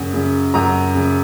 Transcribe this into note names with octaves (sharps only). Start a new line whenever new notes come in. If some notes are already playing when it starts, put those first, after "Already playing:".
Already playing: F#2 C#3
C#3
F#2 A#5
C#3